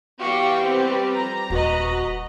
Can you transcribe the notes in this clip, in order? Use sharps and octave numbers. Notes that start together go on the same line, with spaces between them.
E3 G3 B3 F#4 G4 F5 G5
C4 B4
F2 A#5
D#1 F#4 B4 D#5